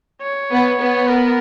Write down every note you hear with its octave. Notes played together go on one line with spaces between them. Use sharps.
C#5
B3
B3
A#4